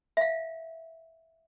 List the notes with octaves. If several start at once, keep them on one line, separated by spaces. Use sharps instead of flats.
E5 F5